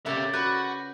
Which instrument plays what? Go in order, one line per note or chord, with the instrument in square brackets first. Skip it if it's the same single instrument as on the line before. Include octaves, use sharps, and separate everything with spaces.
[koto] C#3 A#3 F#5 [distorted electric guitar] G4 E5 [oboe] D5
[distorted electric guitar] F#4 [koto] B4 [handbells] B5 G6